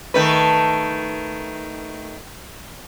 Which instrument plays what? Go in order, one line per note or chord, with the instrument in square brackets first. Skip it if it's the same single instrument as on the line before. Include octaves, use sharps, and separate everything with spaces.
[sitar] D#3 A3 B4